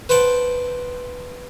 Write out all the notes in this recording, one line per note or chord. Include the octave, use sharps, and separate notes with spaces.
B4 C5 F#5 G5 A5